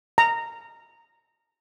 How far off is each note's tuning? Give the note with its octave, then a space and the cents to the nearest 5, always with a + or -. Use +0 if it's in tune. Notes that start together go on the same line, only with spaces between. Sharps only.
A#5 -10